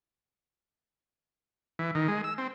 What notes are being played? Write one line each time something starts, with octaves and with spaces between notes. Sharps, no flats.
E3
D#3
G#3
E6
C4